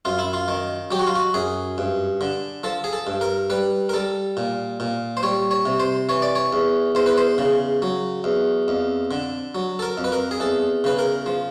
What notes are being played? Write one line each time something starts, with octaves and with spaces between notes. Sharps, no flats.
F#2 F4
E4
F4
D#3
F#3 G4
F#4
F4
F#4
F#2 G#4
G2
D3
F3 A4
G#4
A4
G2
A#4
G3 B4
A#4
G3 A4
A#2
A#2
C5
G3 C#5
C#5
C3
C5
E3 C#5
D5
C#5
E2
E2 C5
B4
C5
C#3
F#3
E2
F2
D3
F#3
A4
A#4
F2
B4
A#4
G#4
E2 A4
C#3 B4
A#4
F3